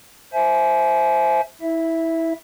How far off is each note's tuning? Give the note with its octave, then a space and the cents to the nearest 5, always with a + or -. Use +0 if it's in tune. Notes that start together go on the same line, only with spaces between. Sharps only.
C5 +0 E5 +0 G#5 +35
E4 -20 E5 +0